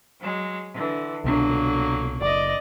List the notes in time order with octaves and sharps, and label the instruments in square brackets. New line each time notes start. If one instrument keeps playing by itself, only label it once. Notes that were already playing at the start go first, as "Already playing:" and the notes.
[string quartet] F#3 G#3
D3 E3
[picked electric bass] C2 B2 D4 [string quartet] D3 F#3 A#3
[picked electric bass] F#1 [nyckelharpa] D5 D#5